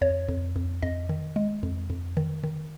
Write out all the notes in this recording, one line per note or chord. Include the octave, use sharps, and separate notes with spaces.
F2 C#5
F2
F2
F2 D#5
D#3
G#3
F2
F2
D#3
D#3